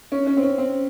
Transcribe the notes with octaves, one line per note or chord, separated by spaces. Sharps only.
C#4
C#4
C4
C#4
C4